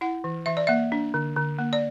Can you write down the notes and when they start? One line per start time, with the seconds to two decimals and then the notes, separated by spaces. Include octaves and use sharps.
0.01 E4 F#5
0.24 E3
0.46 E3 E5
0.57 D5
0.67 A#3 E5
0.92 D4
1.14 D3
1.36 D3
1.59 A#3
1.73 D5